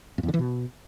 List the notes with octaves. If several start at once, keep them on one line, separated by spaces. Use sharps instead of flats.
F2
E2
D3
E3
B2